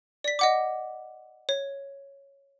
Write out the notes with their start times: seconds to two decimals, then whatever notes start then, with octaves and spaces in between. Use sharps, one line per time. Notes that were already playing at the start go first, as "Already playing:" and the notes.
0.24 D5 B6
0.39 D#5 F#5 D6
1.49 C#5